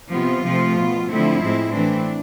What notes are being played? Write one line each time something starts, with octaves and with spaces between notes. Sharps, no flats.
C3 F3 B3 F4
C3 F3 A3 C4
B2 B3
D3 F3 A3 C4 E4
A2 G#3 C4
E3 A3 C4 D4